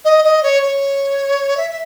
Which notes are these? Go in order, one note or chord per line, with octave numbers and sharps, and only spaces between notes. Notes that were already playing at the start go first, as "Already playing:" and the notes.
D#5
D#5
C#5
C#5
E5
E5